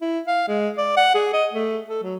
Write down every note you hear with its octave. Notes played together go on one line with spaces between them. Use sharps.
E4
F5
G#3
D5
F#5
G#4
D#5
A3
A4
F#3